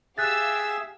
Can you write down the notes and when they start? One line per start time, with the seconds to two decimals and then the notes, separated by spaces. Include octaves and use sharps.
0.18 G4 G#4 E5 F5 E6 F#6 A6